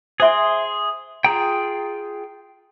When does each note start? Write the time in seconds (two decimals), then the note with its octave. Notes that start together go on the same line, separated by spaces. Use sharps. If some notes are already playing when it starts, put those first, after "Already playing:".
0.20 G#4 C5 E5 G#5 C6
1.24 F4 G#4 G5 A#5